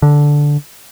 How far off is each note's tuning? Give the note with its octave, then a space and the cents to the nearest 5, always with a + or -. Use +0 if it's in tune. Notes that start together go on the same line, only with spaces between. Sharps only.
D3 -5